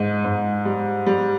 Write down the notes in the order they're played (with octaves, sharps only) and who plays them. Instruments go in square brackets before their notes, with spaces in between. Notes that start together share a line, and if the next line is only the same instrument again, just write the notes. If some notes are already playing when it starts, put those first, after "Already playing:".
Already playing: [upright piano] G#2 G#3
G#2
G3
G3